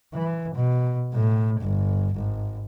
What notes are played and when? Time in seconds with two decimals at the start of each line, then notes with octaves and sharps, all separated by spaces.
0.14 E3
0.55 B2
1.14 A2
1.60 G1
2.14 G#1